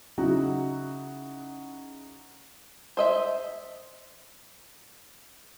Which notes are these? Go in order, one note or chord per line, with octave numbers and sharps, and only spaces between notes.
C#3 F#3 D#4 E4 F#4
C5 D#5 E5